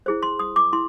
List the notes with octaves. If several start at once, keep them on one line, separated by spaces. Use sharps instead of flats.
E4 G#4 C5
C6
D#6
D6
E4 C6